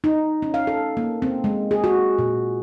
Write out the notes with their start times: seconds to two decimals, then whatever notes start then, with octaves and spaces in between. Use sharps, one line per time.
0.04 D#4
0.42 C#4
0.54 F5
0.67 A4
0.97 A#3
1.22 C4
1.44 G#3
1.71 G#4
1.84 F#4
2.19 A#2